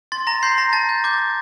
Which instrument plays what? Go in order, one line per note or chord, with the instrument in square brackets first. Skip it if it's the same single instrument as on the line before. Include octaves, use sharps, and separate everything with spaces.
[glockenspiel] C6 A6
A#5 A#6
C6 G6 C7
A#5 A#6
A5 A6
G6
D6 G6 A6